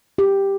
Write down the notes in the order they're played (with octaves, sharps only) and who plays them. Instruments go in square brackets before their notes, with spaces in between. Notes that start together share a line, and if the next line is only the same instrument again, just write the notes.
[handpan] G4